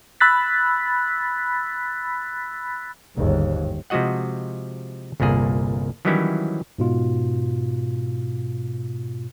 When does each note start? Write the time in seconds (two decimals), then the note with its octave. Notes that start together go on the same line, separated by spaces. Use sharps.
0.20 B5 E6 F#6 A6 B6
3.16 G1 D#2 G#2
3.90 C3 F3 G#3 F#4 D#5 F#5
5.20 G1 C2 A#2 A#3 G#4
6.05 D#3 E3 F#3 G3 C#4 E4
6.78 G#2 B2 F4